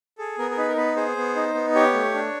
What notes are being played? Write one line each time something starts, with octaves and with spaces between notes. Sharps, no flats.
G#4 A4
B3 A#4
A#4
D#4 B4
A#4
B3 B4
G#4 C5
B3
D#4
B3
G4 C#5
A3
D4